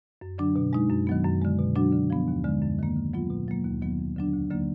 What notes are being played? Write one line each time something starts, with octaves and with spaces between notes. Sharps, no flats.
F#2
D3 F#3 D4
B2
G#3 D#4
F#2
D#3 F#3 B3
F#2
D3 G#3
B2
F#3 D4 F#4
D3
F3 B3
D#2
D3 G#3
F#2
D#3 A#3
D3
F#3 B3 F4
B2
F#3 A#3
D#2
D#3 F#3 B3
F2
D3 F#3 D4
D2
D3 F#3 A#3 D#4